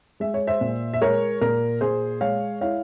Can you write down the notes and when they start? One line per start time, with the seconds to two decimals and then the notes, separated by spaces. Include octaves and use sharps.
0.20 G#3 E5
0.34 C#5
0.47 C5 E5
0.61 A#2
0.94 E5
1.01 G#3 A#4 C#5
1.41 A#2 A#4
1.81 A#2 G#4 C5
2.21 G#3 C#5 F5
2.61 E4 C#5 F5